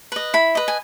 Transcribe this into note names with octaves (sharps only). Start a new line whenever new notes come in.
B4 D#5
E4 B5
B4 D#5
G#5